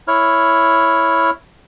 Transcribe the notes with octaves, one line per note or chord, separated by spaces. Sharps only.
E4 C#5 F6